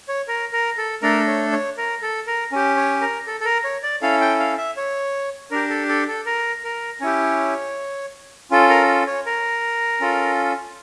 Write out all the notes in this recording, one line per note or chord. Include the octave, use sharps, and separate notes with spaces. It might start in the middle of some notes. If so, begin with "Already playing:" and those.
C#5
A#4
A#4
A4
A3 D4 A4 A#4
C#5
C#5
A#4
A4
A#4
C#4 G4
C#5
A#4
A4
A4
A#4
C#5
D5
C#4 E4 A4 F5
G5
F5
E5
C#5
D4 G4 A#4
A4
A4
A4
A#4
A#4
C#4 E4 G4 C#5
C#4 F4 A4
A#4
C#5
A#4
C#4 F4 A4